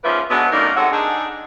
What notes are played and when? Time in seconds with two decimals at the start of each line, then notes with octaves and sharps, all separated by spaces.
0.04 G#2 F3 A#3 C#4 B4 E5
0.31 B2 D3 F#3 G#3 B3
0.52 F#2 A2 A#3 D4 D#4 A#4
0.77 C3 G#3 A4 C#5 F#5
0.92 D4 D#4 G#4